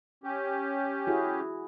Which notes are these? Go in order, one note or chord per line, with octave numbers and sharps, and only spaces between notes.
C#4 G4
E4 F#4 G#4